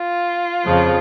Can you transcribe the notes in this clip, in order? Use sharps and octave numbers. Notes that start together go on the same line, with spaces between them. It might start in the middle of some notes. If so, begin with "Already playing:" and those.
Already playing: F4
F2 C#3 F3